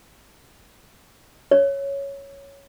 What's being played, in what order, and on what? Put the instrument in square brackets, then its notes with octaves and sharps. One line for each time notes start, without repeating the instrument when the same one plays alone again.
[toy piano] C#5